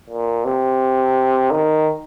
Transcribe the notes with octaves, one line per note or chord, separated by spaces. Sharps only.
A#2
C3
D#3